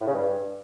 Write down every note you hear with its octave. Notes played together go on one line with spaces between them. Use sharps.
A2
C#3
G2